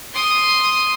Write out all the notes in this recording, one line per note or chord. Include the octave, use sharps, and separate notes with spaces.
C6 D#6